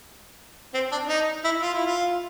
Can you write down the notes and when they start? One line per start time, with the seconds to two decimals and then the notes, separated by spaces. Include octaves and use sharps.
0.74 C4
0.92 D4
1.09 D#4
1.44 E4
1.62 F4
1.74 E4
1.86 F4